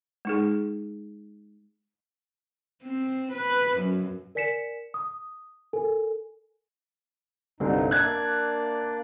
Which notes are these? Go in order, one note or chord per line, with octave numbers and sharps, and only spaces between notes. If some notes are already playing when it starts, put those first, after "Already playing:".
G#3 D#4 G#4
C4
B4
F#2
A#4 D5 G#5 B6 C#7 E7
D#6
A4 A#4 G#5
C2 G2 D3 C4 D#4
A#3 D4 D5 E5 F#6 G#6